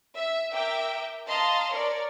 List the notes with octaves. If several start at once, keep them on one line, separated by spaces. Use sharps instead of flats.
E5
A#4 E5 G5 D6
D#5 F5 A5 A#5 C6
A#4 C#5 D5